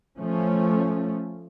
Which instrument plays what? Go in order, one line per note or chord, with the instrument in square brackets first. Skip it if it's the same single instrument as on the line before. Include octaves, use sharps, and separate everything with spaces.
[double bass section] F3 A3 C#4